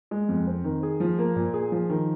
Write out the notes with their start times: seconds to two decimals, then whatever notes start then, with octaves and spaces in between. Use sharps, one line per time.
0.11 G#3
0.29 F2
0.47 C4
0.64 D#3
0.83 G#4
1.00 F3
1.19 A#3
1.36 A#2
1.54 G#4
1.72 F3
1.89 D#3